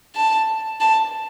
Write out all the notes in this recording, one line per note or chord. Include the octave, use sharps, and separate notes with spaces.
A5
A5